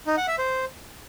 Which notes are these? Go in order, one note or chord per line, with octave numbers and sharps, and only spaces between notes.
D#4
F#5
E5
C5